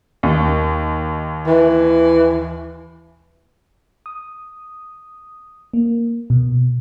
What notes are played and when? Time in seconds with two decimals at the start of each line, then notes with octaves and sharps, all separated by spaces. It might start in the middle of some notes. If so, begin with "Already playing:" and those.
0.23 D#2
1.47 E3
4.06 D#6
5.74 A#3
6.30 B2